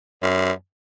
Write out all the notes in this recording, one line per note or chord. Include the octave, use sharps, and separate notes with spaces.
F#2